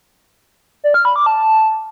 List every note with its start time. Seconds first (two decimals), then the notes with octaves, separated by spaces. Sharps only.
0.84 D5
0.94 F6
1.05 B5
1.16 D6
1.26 A5